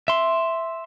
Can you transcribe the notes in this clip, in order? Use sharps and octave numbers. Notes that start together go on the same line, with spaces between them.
E5 C6